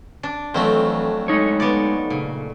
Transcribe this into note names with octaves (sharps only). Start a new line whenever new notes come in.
D4
F2 E3 F#3 A3 C4
G#3 D#4 C#5
B3 D5
A#2 C#3